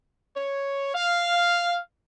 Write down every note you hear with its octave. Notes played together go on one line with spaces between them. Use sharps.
C#5
F5